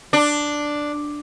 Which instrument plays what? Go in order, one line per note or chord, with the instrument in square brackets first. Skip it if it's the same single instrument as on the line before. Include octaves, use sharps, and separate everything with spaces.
[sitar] D4